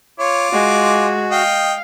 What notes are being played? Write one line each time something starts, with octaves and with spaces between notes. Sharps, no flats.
F4 C#5 D6
G#3 F#4
D#5 F5 G5